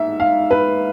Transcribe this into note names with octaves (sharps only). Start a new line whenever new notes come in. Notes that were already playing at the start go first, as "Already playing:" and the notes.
Already playing: G#2 E5
F5
B4